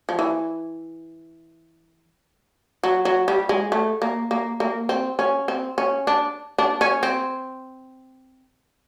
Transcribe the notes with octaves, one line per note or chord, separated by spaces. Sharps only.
F3
E3
F#3
F#3
G3
G#3
A3
A#3
A#3
A#3
C4
C#4
C4
C#4
D4
D4
C#4
C4